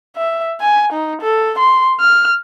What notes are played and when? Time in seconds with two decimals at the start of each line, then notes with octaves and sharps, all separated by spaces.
0.16 E5
0.61 G#5
0.93 D#4
1.22 A4
1.58 C6
2.00 F6